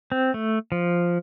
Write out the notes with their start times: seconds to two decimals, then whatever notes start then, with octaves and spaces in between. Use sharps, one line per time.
0.12 C4
0.34 A3
0.72 F3